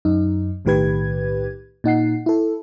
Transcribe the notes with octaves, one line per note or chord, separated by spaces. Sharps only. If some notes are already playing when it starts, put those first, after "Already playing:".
F#2 D#4
B1 A2 D#3 G4 B4 G#6
A#2 D#4 F#5 C7
E4 A4